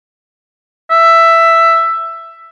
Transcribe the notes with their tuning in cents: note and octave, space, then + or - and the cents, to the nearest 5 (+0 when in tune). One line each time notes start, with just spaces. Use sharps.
E5 +10